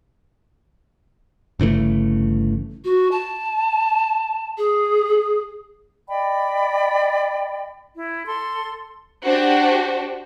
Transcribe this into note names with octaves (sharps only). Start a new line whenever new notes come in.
G1 C#3 E3 A3
F#4
A5
G#4
D5 D#5 G5 B5
E4
A4 C6
D4 F#4 G4 C5